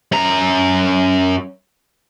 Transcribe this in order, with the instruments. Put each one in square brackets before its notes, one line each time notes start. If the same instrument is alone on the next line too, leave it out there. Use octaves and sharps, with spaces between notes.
[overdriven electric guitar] F#2 A#5